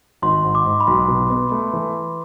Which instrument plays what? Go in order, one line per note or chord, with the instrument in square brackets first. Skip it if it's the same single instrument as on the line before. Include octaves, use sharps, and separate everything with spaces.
[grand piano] G#1 [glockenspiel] C6
[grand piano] G#2
[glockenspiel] D6
[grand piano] G#2
[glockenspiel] B5
[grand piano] B1 [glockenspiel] C6
[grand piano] B2
B3
A3
E3